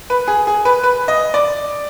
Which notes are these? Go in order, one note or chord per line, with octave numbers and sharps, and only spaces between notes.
B4
G#4
G#4
B4
B4
D#5
D5